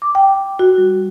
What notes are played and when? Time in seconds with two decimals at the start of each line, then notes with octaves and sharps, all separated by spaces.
0.02 D6
0.15 G5
0.59 F#4
0.78 G3